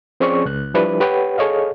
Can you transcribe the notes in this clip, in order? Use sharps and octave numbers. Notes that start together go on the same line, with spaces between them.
F3 C4 C#4 G#4 D5 C#6
C#2 F#6
F3 G3 D4 E4 B4 D5
G4 B4 C#5 F#5 G5
G#4 A4 C#5 D#5 F5